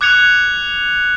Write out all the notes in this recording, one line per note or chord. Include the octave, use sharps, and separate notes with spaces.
D6 F#6 G#6 C#7 F7